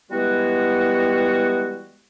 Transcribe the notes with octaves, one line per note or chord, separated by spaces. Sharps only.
E3 G3 G#3 B3 F#4